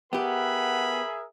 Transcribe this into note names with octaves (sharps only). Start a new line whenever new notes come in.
B3 G4 G#4 A#4 E5 F#5 B5